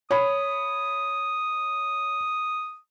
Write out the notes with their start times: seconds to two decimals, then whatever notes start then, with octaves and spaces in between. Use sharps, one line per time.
0.11 C#5 B5 D#6